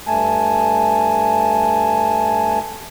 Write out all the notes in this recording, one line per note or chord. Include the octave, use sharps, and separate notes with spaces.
G2 A3 G#5 A5